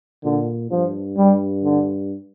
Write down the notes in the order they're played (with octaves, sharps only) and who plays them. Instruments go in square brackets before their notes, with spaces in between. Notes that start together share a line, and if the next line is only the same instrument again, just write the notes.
[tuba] A#2 [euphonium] D3
[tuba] G2 [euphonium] F3
[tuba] G2 [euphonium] G3
[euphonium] D3